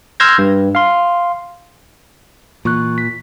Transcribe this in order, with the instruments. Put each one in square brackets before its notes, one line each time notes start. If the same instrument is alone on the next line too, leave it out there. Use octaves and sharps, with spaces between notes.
[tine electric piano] C6 E6 F6 G6 G#6 A#6
G2
F5 C6
[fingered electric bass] A#2 [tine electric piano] E3 C#6 F#6
[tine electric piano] B6